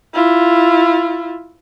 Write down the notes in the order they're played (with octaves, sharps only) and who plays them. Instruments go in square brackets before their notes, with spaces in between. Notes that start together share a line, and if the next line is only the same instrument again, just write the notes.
[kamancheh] E4 F4